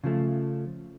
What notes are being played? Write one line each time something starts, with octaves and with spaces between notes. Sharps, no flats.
C#3 F3 A3